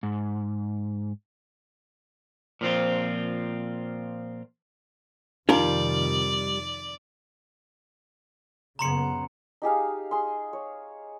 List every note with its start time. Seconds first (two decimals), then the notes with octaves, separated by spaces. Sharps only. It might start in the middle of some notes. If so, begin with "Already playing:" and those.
0.03 G#2
2.61 A#2 F3 C4 F4
5.49 F2 C3 D#3 G3 D#4 F4 A#4 D5
8.79 F#2 C#3 B3 A#5 C6 C#7
9.62 D#4 G4 G#4 F5
10.11 G#4 C6
10.53 C#5